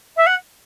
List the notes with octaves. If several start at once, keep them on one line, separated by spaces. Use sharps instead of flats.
E5
F#5